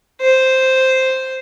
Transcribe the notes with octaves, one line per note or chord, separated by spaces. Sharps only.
C5